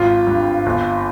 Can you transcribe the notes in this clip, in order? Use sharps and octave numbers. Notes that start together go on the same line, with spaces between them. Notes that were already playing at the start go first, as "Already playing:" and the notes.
Already playing: G#1 F4
G2
G1